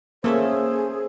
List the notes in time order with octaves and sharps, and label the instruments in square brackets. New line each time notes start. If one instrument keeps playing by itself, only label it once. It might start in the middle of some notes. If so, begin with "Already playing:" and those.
[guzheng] A3 C#4 E5 [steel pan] A#3 [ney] G#4 [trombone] C5